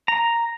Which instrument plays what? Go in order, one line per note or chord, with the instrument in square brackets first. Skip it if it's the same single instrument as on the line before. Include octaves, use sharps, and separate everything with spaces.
[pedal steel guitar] A#5